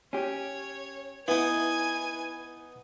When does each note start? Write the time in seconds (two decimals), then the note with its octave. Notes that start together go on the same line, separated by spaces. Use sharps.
0.13 C#4 G4 C#5
1.28 B3 D#4 E4 B4 G#5